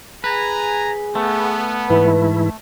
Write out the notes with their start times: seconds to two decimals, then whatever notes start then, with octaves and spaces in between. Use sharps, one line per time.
0.24 G#4 B4 G#5 A#5
1.15 A3 B3
1.90 G#2 E3 E4 B4